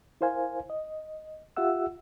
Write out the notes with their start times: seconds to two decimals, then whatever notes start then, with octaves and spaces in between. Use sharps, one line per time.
0.21 E4 A#4 C5 F5 G#5
0.70 D#5
1.57 F4 G4 E5 F#5 E6